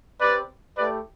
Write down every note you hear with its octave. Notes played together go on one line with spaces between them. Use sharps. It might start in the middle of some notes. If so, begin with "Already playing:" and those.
C4 G4 B4 D5
A3 E4 G4 B4 D5